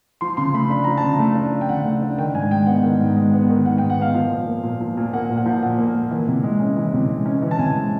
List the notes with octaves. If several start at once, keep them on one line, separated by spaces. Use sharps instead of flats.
F3 C6
C#3 C6
A3 B5
D4 B5
F3 A#5
A5
C#3
A#5
A3
D4
F3
G5
C#3 F#5
A3
D4
D#3 G5
G#2 G#5
G#3 G5
B3 F#5
D#3
G#2
G#3
B3
D#3
G#2 F#5
G5
G#3
F#5
B3 F5
F3
A#2
A#3
A#2
F3
A#2
A#3 F#5
A#2
F#5
F3
A#2 F#5
A#3
A#2
E3
C3
G#3
C#4
E3
C3
G#3
C#4
E3
A5
C3 G#5
G#3